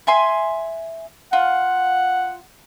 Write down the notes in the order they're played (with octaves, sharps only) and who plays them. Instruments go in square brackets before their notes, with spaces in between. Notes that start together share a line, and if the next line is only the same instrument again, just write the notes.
[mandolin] E5 G#5 C6
[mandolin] F4 [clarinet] F#5